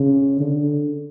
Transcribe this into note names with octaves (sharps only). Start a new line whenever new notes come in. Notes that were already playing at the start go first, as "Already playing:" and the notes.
Already playing: C#3
D3